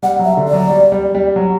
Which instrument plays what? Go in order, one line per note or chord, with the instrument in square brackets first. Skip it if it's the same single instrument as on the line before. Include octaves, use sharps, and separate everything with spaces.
[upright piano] G3 [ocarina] F#5
[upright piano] F#3
[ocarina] E5
[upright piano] D3
[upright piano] F#3 [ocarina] D5
[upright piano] G3
G3
G3
F#3